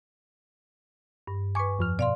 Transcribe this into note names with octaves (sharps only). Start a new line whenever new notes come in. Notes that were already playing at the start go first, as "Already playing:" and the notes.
G2
B4 G#5 C#6 D6
F2 F3 F6
B2 D5 F5 C6